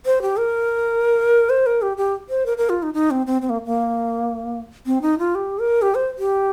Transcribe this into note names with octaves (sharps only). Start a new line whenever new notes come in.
C5
G4
A#4
C5
A#4
G4
G4
C5
A#4
A#4
F4
D#4
D#4
C4
C4
C4
A#3
A#3
C4
D#4
F4
G4
A#4
G4
C5
G4